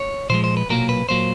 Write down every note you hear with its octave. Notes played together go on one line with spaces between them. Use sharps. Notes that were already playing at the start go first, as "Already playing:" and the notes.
Already playing: C#5
A#2 F3 G#3 C5
C5
B4
B1 A#2 F#3 A#3 A#4
B4
A#2 F#3 A#3 C5